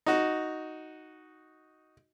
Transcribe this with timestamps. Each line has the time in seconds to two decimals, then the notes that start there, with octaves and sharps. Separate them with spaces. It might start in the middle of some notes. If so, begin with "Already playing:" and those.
0.06 D#4 F#4